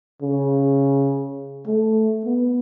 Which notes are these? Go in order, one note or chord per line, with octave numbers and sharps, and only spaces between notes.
C#3
A3
B3